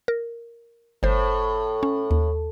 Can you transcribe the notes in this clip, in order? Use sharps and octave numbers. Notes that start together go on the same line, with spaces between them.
A#4
G1 A2 C5
C#4
D#2